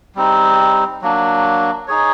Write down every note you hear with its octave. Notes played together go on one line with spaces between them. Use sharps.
G3 C4 D#4
F#3 A#3 D4
D#4 G#4 C#5